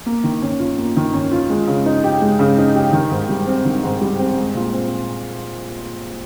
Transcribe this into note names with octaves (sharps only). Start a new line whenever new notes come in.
A#3
D#3
C#4
F4
A#3
D#3
C#4
F4
G#3
C#3
D#4
G4
G#3
C#3
D#4
G4
D#3
G#2
G3
C4
D#3
G#2
G3
C4
G#3
A#2
C4